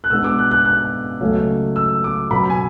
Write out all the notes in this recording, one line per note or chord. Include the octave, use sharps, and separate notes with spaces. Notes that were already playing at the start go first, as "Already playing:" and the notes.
F#6
B2 G#3 B3 D4 E6
D6
F#6
F#6
F#6
C#2 C#3 F#3 A3 C#4
E6
D6
B2 F#3 C#4 B5
G#5